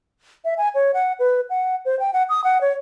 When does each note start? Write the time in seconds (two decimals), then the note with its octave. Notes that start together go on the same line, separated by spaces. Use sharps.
0.45 E5
0.58 G#5
0.75 C#5
0.94 F#5
1.19 B4
1.50 F#5
1.85 C5
2.00 G5
2.13 F#5
2.29 D#6
2.44 F#5
2.61 C#5